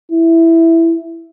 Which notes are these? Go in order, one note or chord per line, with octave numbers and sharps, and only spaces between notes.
E4